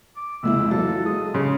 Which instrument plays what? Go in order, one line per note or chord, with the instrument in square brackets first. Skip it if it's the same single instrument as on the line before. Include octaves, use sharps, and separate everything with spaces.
[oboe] D6
[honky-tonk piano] F1 C#2 E4 [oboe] E6
[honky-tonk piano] E3 F#3 F4 [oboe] A4
[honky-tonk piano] G#3 [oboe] D#6
[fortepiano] C#3 [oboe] C6